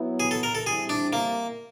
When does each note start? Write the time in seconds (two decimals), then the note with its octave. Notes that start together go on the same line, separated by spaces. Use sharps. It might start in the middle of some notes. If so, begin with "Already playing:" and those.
Already playing: F#3 B3 E4
0.20 G#4
0.31 A4
0.43 A#4
0.55 A4
0.66 D3 G3 C4 E4 G#4
0.89 D4
1.13 A#3